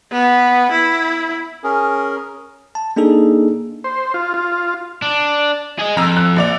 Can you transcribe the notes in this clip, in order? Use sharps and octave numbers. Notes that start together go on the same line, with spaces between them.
B3
E4
C#4 G#4 A#4
A5
A#3 D4 D#4 G#4 A4
C5
F4
F4
D4
G#4 D#5
F2 A#5 E6
F#6
A#1 D5 F7